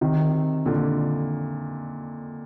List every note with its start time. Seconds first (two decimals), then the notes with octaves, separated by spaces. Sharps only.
0.01 C3 D#3
0.66 A#2 D3